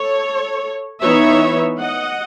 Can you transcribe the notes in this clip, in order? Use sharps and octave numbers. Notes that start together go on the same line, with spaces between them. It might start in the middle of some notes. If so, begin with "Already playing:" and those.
Already playing: A4 C#5
E3 B3 D#4 C#5 E5
D#5 F#5